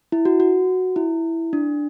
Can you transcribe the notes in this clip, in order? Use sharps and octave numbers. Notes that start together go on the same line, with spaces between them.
E4
F#4
F#4
E4
D4